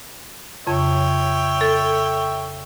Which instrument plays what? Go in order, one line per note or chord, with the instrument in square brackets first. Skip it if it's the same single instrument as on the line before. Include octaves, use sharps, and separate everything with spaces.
[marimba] F2 C#3 [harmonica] C#5 E5 G5
[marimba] A4